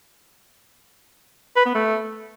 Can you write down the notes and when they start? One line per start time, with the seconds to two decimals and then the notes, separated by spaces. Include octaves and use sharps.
1.56 B4
1.66 B3
1.75 A3